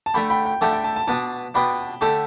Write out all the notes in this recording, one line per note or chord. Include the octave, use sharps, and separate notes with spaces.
A5
D3 A3 G4 G5 B5
G5 B5
G5
D3 A3 G4 A5
G5
A5
A5
B2 B3 D4 A5
B2 B3 D4 G5 B5
D3 A3 G4 A5